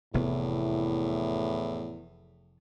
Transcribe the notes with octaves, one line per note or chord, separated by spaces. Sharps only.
F1 E2 A2 C3 B3